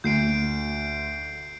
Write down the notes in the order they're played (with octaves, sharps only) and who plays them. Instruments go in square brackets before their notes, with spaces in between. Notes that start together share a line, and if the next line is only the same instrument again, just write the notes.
[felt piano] D2 [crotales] G6 C7 D7